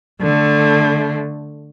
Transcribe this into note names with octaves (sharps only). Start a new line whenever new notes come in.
D3 A3